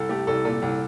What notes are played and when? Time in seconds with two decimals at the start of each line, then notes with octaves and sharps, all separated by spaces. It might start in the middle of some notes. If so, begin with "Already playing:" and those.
Already playing: C2 A4
0.09 A3 G4
0.27 C2 A4
0.45 A#2 A4
0.62 C2